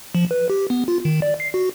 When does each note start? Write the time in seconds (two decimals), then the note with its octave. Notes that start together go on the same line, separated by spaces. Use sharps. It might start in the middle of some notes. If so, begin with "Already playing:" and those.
0.15 F3
0.31 B4
0.50 G4
0.70 B3
0.88 F4
1.05 D#3
1.22 D5
1.40 C7
1.54 F#4